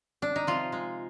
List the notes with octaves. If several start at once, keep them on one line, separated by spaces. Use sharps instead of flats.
D4
D#4
C3 F3 F4
G#3